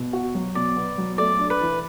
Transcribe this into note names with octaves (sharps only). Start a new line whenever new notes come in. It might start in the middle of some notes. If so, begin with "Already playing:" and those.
Already playing: B2
F#4
F#3
B2 D5
B3
F#3
A3 D5
D4
B4
E3